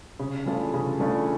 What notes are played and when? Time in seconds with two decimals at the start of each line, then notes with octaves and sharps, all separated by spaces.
0.19 C#3
0.46 E3 A3 D4 F4
0.74 C#3
0.99 E3 A3 D4 F4